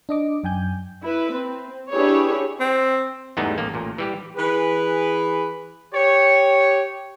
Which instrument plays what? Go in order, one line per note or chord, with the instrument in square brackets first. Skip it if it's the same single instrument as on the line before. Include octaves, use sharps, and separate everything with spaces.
[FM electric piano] D4 D#5 D6
F#2 G5 G#5 G6
[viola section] E4 B4
C4
D4 E4 G4 G#4 B4 C#5
[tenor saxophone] C4
[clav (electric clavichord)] E2 G#2 G3 A3 B3 D#4
A1 A#3
A1 A#2
E3 G3 G4
[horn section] E3 G#4 B4
G4 C#5